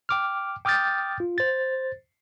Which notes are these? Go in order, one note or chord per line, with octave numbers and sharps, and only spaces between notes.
G5 D6 F6
G5 D6 D#6 F6 G6 A6
F4
C5 A6